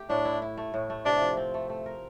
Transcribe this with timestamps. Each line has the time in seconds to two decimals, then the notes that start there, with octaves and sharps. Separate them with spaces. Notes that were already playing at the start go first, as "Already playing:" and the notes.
Already playing: A3 G4
0.10 A2 D4
0.25 E4
0.42 E4
0.57 A3
0.74 A2
0.90 A3
1.05 C3 D4
1.21 F3
1.37 C4
1.54 A3
1.70 A3
1.86 A#4